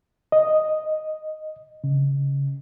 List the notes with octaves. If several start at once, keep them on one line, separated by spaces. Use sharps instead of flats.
D#5
C#3